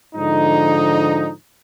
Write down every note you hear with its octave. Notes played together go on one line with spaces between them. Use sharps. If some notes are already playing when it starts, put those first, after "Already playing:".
G#2 D3 F3 D#4